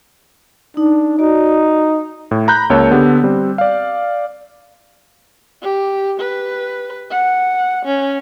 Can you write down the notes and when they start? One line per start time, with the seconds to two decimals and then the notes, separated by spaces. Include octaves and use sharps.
0.77 D4 D#4
1.19 D#4 F#4 D5
2.31 A2
2.48 A#5 B5 F#6 G6
2.70 C#2 A#3 C#5 A5 E6
2.91 D3 B3 G4
3.24 G3 C4
3.58 D5 F5
5.63 G4
6.21 B4
7.12 F#5
7.86 C#4